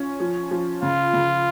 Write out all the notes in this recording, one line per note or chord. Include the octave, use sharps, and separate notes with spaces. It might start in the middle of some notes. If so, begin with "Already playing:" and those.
Already playing: C#4 F4
F3
F3
C#3 F4
C#3